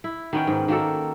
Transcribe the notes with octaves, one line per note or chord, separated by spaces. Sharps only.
E4
D#3 B3 C#4 G5
G#2
D#3 A#3 F#4 A4